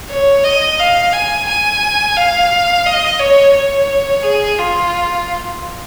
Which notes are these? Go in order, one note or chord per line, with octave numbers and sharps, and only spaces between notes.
C#5
D#5
F5
G#5
G#5
F5
D#5
C#5
C#5
G#4
F4